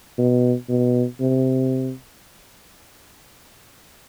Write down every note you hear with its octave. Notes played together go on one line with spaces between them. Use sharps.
B2
B2
C3